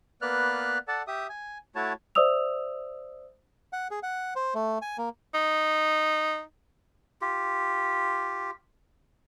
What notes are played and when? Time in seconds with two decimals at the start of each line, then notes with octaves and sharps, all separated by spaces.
0.22 A#3 B3 B4 D5 F6 F#6
0.88 A4 D5 F#5 A5
1.07 G4 E5 D#6
1.29 G#5
1.75 A3 E4 F#4 C#5 A5
2.15 C5 D5 E5 D#6 E6 F7
3.73 F#5
3.91 G#4
4.03 F#5
4.36 C5
4.55 A3
4.82 G#5
4.98 A#3
5.34 D#4
7.21 F4 G4